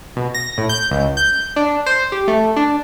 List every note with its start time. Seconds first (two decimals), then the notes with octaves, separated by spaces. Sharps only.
0.16 B2
0.34 A#6
0.58 A2
0.69 G6
0.91 C#2
1.17 G6
1.56 D4
1.86 C5
2.12 G4
2.28 A3
2.56 D4